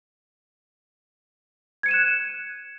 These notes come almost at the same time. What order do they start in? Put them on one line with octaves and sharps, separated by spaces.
G#6 C#7 D#7 E7 F#6